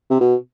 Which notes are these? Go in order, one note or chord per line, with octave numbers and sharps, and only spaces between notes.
C3
B2